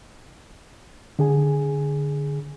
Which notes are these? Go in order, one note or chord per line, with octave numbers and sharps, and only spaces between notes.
D3 G#4 G#5